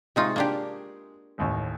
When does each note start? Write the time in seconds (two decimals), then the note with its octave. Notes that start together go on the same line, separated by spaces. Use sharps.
0.16 C3 G#3 D#4 F4 C#6
0.36 A#3 D4 G4
1.38 A1 D#2 A2